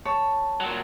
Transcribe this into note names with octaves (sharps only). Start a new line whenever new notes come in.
C#5 A5
A#2 F#3